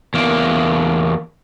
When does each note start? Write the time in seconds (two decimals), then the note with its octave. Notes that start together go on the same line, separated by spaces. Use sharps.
0.14 E2 A#3